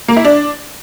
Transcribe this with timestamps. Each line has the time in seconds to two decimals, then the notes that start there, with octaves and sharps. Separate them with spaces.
0.08 A#3
0.16 E4
0.25 D4